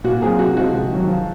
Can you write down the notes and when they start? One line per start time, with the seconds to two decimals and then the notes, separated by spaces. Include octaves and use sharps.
0.04 A#2 F#4
0.21 F#3 C4 F4 G#4 A#4
0.39 C3 F#4
0.57 F3 G#3 C4 F#4
0.74 C3
0.91 D#3 F#3
1.08 F3